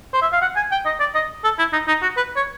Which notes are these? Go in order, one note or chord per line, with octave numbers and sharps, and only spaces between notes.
C5
E5
F5
F#5
G#5
G5
D#5
D5
D#5
A4
E4
D#4
D#4
F#4
B4
C#5